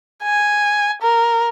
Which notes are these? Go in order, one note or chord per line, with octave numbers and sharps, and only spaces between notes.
G#5
A#4